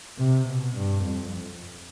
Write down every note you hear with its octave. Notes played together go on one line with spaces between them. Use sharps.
C3
B2
G2
F2